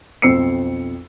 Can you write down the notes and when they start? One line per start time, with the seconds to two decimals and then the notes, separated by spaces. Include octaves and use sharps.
0.22 B1 F2 C4 E6 C7 C#7